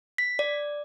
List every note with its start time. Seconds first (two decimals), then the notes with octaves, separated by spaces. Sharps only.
0.18 B6
0.39 D5